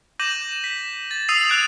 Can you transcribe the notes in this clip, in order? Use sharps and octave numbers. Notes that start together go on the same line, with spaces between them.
D6 G6 A#6 D#7 E7 F#7
B6
A6
D#6 E6 C7 D#7 F7
D#6 F#6 G#6 D7 E7 F7